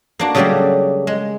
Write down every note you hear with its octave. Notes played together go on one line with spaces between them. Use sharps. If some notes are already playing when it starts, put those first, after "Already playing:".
A#3 D4 F#4
C#3 F#3 G3 A3 A#3 G4
G#3